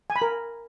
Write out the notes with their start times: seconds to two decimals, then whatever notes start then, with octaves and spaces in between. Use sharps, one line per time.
0.10 G#5
0.16 B5
0.22 A#4